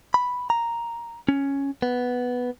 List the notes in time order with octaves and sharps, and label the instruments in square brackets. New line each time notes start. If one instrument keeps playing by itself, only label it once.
[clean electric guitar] B5
A#5
C#4
B3